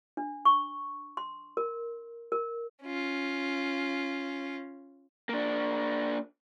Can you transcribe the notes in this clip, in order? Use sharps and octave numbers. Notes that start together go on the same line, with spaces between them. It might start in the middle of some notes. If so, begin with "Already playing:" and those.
D4
C#6
C6
A#4
A#4
C#4 F4
A#3 D4